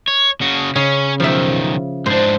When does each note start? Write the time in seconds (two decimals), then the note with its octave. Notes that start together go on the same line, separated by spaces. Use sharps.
0.08 C#5
0.41 C#3 F#4
0.76 C#3 C#4
1.20 B1 D#3 F3 E5
2.06 G#2 D4 C5